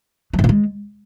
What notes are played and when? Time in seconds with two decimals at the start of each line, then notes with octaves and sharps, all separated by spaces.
0.33 F#3
0.39 G#2
0.44 A#2
0.49 G#3